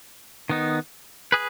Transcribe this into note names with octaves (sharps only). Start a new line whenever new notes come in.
D#3 B3 D#4
G#4 B4